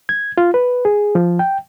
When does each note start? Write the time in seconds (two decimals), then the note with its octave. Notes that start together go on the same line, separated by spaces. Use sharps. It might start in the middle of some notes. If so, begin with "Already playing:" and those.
0.09 G#6
0.38 F4
0.54 B4
0.85 G#4
1.15 F3
1.39 G5